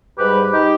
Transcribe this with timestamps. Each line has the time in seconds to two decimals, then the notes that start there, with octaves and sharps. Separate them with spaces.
0.18 G#2 G3 G4 B4
0.52 D#4 G4